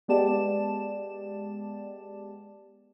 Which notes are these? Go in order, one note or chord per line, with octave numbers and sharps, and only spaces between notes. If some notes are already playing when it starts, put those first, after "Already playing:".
G#3 B3 G4 D5 A5 E7